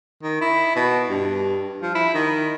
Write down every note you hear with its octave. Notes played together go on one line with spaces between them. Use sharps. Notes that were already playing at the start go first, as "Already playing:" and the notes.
D#3
E4
B2
G2
F3
E4
D#3